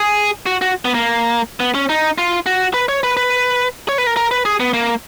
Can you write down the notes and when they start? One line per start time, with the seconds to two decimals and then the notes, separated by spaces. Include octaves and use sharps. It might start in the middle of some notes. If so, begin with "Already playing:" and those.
Already playing: G#4
0.46 F#4
0.61 F#4
0.85 B3
0.94 A#3
1.60 B3
1.75 C#4
1.89 D#4
2.18 F4
2.46 F#4
2.74 B4
2.89 C#5
3.03 B4
3.17 B4
3.89 C#5
3.98 B4
4.07 A#4
4.17 A#4
4.31 B4
4.45 G#4
4.60 B3
4.74 A#3